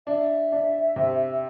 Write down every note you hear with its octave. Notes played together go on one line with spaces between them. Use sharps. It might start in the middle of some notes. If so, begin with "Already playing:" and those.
D4 E5
D4
C3